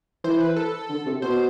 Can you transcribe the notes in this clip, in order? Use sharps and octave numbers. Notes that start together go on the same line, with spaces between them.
E3 C5
B4
A4
D3
C3
B2 C5